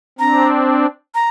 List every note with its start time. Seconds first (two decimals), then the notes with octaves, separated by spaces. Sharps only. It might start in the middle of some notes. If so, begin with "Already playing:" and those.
0.19 C4 D4 A#5
1.15 A#5